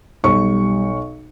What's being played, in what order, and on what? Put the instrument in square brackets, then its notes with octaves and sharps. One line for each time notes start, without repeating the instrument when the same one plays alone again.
[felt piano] B1 C#6 [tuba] G3